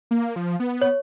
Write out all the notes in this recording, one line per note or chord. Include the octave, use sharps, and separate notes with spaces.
A#3
F3
B3
C#5